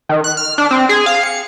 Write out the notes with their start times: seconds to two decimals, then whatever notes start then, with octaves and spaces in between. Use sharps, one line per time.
0.09 D#3
0.24 F#6
0.37 F6
0.58 D4
0.71 C4
0.89 G#4
1.06 F5
1.23 C#7